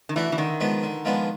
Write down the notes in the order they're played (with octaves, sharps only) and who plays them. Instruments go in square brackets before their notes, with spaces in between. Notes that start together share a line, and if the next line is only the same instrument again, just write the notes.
[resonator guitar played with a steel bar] D#3
[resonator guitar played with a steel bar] E3 [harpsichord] A3 D4 F#4
[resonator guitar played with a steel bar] E3
[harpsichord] D3 [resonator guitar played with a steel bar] D#3
[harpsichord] F3 G#3 B3 D4
D3
F3 G#3 B3 D4